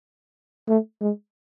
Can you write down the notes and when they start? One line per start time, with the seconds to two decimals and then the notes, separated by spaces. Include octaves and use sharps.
0.68 A3
1.01 G#3